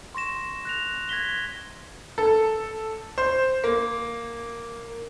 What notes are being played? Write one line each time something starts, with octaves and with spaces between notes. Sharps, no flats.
C6 C#6 A#6 E7
F#6 A#6 F7
G#6 A#6 B6 G7
A4
C5
A#3